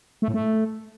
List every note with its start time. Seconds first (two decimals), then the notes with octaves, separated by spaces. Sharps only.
0.22 A3
0.28 A2
0.34 A3